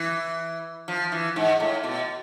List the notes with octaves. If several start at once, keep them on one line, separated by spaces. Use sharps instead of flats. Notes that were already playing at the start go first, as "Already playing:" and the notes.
Already playing: E3
F3
E3
G#2
A2
B2